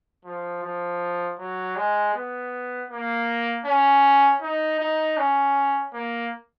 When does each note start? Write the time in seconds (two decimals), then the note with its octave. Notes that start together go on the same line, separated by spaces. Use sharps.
0.25 F3
0.63 F3
1.39 F#3
1.76 G#3
2.14 B3
2.90 A#3
3.66 C#4
4.41 D#4
4.80 D#4
5.17 C#4
5.93 A#3